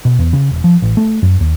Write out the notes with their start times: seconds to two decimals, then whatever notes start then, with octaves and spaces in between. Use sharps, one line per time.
0.05 B2
0.19 E2
0.33 C#3
0.51 E1
0.64 F3
0.82 A1
0.97 A3
1.22 F#2
1.40 D#2